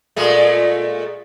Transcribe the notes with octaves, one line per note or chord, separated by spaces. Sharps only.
A#2 G#3 A3